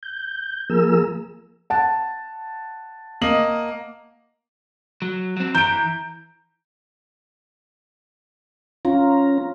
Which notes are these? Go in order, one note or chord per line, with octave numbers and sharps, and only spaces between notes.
G6
F3 A#3 G#4 A#4 E6
F#5 A5
A#3 D#5 F#7
F#3
F#3 C4
E3 A#5 G6 D7
C#4 F4 A#5